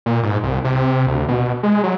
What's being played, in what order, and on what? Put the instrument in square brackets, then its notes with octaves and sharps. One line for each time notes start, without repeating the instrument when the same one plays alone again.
[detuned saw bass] A#2
G#2
C2
C3
D2
B2
G#3
F#3